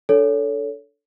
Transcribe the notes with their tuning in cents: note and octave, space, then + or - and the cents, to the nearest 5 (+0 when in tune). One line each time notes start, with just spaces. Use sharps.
D4 +0 A4 +0 C#5 +25